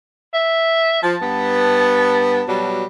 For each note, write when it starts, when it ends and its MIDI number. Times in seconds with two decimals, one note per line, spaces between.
0.34 1.02 76
1.03 1.15 53
1.03 2.73 81
1.20 2.42 43
1.20 2.42 59
2.47 2.83 47
2.47 2.83 54
2.47 2.83 55